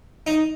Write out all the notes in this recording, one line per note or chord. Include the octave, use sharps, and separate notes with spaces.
D#4